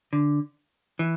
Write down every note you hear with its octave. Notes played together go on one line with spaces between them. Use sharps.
D3
E3